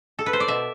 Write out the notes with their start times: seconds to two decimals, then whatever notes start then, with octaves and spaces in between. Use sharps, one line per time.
0.19 A4
0.26 B4
0.33 C5
0.40 D5
0.48 B2 E5